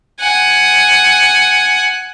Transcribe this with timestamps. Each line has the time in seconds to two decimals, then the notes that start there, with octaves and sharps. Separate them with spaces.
0.20 F#5 G#5